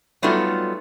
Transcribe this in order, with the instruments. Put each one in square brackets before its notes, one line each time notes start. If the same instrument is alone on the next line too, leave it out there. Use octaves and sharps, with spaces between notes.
[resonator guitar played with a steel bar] F#3 G3 A3 B3 D#4 F4